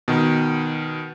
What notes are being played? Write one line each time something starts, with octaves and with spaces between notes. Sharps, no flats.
B2 D#3